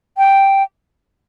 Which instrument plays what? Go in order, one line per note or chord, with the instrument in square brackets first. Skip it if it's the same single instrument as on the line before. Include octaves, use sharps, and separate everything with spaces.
[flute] G5